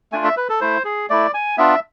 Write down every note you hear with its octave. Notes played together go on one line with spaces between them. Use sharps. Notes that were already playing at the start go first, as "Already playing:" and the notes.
A3 D4 F4 G#5
E5
B4
A4
A3 E4 C5
G#4
A3 E4 D5
G#5
B3 D4 F4 E5